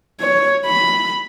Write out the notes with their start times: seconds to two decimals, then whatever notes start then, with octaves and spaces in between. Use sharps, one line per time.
0.20 C#5
0.66 B5